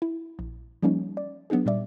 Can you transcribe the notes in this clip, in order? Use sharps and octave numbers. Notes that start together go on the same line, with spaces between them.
E4
A#1
F3 G3 A#3 C#4 D#4
D5
F#3 B3 D4 D#4 G#4
A#2 G3 D5 E5